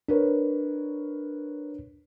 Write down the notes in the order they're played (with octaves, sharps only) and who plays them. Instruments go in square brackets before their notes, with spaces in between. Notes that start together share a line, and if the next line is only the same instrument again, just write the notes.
[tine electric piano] D4 [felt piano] A#4 B4 C#5